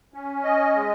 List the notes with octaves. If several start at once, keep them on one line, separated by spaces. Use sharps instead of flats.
C#4
D#5
G#3